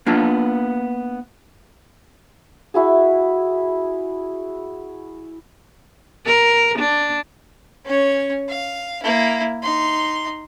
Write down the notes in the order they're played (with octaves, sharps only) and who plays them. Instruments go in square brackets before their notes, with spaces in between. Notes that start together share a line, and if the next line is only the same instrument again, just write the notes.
[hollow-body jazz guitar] A#3 B3 D4 F4
[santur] E4 F#4 G#4
[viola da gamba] A#4
D4
[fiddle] C#4 C#5
F5
A#3 E4
D#4 C6